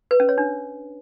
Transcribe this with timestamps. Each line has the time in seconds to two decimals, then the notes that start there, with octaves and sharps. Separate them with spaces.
0.11 B4
0.20 C#4
0.29 C#5
0.38 D4